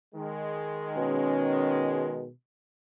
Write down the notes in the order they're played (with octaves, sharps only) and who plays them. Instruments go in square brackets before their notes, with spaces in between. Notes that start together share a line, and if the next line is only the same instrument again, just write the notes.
[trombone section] D#3 G#3
[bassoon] B2 [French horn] C#4